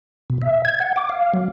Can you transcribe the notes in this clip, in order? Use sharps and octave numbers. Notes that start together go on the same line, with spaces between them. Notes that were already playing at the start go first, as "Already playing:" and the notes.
B2
E5
G#6
F#5
D6
F5
F#3